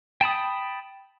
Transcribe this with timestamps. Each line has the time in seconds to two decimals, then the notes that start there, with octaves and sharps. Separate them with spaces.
0.21 G5 A5 B5 D#6